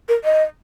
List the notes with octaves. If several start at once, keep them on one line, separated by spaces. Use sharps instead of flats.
A#4
D#5